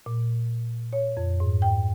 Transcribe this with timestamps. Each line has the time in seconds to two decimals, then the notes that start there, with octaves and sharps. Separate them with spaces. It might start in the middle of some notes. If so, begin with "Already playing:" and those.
0.06 A#2
0.93 C#5
1.17 F2
1.40 G#2
1.62 G5